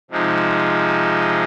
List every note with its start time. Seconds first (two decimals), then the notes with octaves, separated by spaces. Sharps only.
0.11 C3 F3 G#3 D#4